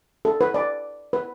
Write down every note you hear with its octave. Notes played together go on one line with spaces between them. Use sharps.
A4
B4
D5
B4